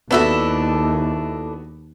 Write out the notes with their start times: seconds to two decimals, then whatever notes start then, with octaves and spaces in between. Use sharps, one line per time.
0.11 D#2 B3 D4 E4 F#4 A4